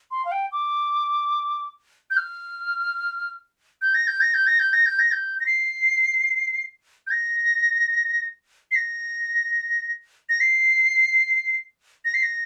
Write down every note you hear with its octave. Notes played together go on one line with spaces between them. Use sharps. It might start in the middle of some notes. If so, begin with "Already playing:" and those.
C6
F5
G5
D6
G6
F6
G6
A#6
G6
A#6
G6
A#6
G6
A#6
G6
A#6
G6
A#6
C7
G6
A#6
C7
A#6
A#6
C7
A#6
C7
A#6